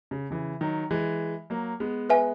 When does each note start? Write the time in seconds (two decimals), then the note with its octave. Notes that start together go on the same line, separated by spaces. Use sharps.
0.11 C#3
0.31 C#3 E3
0.61 D#3 F#3
0.91 E3 G#3
1.50 F#3 A#3
1.80 G#3 B3
2.10 B4 E5 G#5